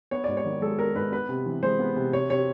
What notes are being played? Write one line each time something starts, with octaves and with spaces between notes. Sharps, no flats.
B3 C#5
G#2 D5
C#5
D#3
G#3 A4
B3 A#4
G#2 B4
B3 B4
C3
E3
G#3 C5
B3
C3
C3 C#5
C3 C#5